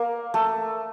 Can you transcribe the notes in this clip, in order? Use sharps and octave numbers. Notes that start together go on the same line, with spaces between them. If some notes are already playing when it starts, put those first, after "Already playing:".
Already playing: A#3 A#4
A3 A4